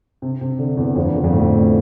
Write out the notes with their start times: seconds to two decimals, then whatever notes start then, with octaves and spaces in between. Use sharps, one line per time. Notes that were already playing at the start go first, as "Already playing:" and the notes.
0.22 C3
0.41 C3
0.59 D3
0.77 E2 E3
0.96 F2 F3
1.05 E2 E3
1.14 D3
1.23 F2 F3
1.32 A2 A3